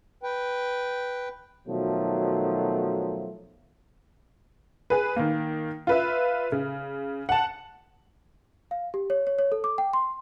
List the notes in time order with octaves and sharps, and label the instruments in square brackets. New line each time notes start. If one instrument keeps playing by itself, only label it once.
[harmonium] B4 G5
[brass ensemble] B2 D#3 F3 F#3 A3
[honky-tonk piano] G#4 B4
D#3 A#3
F4 B4 E5
C#3
F#5 A5
[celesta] F5
G4
C#5
C#5
C#5
A4
D6
G5
C6